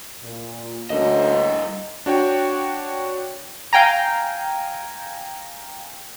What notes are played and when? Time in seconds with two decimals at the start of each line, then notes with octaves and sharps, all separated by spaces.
0.23 A#2
0.90 D2 G2 A#3 C#4 D#5
2.06 D4 F#4 C#5 G5
3.73 F5 G5 G#5 A#5